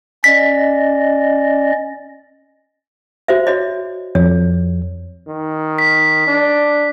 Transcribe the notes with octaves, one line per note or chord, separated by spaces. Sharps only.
C#4 D5 D#5 B6
F#4 C5 E5
F#4 C#5 D#5
F2 C#5
D#3
B6
D4